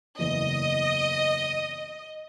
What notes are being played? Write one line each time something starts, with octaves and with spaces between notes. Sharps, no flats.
F#1 E2 D#5